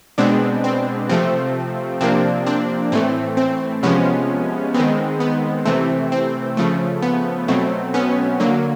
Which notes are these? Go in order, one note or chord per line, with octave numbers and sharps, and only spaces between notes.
B2 G#3 B3 C4 D4
C4
C3 F3 A3 C4
C3 F3 A#3 C4 D4
C4 D4
A2 E3 A3 C4
C4
C3 F3 G#3 B3 C#4
D#3 G#3 B3 C4
B3
C3 E3 A3 C4
C4
C#3 F3 A3
B3
B2 F#3 A3 C4
B3 C#4
D3 F#3 A#3